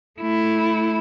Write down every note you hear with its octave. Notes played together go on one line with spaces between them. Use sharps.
A3 E4